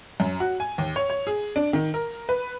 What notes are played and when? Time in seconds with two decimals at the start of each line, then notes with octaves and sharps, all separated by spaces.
0.20 F#2
0.40 F#4
0.60 G#5
0.78 D#2
0.96 C#5
1.10 C#5
1.27 G#4
1.56 D4
1.73 D#3
1.94 A#4
2.29 B4